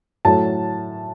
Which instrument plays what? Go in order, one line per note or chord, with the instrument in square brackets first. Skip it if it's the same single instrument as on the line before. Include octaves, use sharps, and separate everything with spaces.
[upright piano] A2 F#3 A3 A5